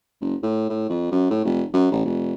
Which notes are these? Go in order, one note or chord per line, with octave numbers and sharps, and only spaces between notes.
F#1
A2
A2
F2
F#2
A2
F1
F#2
A1
F1